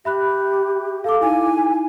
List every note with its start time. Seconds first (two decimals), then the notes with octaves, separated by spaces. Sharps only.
0.05 G4 E5 B5 F#6
1.04 A4 F5 D6
1.21 D#4 E4 G#5